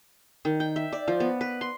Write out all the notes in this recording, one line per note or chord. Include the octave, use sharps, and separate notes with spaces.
D#3
G5
E5
D5
F3
B3
B4
C6